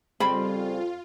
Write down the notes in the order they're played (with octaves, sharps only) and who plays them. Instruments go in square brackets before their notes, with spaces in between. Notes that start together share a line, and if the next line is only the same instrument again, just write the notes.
[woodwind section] F2 [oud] C#3 G3 C4 [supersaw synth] F4 [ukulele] B5